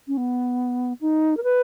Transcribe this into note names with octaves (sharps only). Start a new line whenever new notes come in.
C#4
B3
D#4
A#4
B4